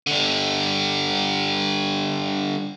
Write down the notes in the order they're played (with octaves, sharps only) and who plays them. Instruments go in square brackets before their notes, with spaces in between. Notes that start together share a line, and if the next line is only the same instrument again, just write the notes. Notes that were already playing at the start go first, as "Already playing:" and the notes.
[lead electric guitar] D3 G3